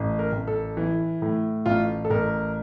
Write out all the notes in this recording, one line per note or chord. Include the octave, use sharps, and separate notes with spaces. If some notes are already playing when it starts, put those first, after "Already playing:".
Already playing: A1
A#4
A1
A4
E3
A2
A1 F4
A4
A1 A#4